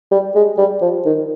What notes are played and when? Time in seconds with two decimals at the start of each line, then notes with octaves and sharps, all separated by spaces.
0.11 G3
0.35 G#3
0.58 G3
0.81 F3
1.06 D#3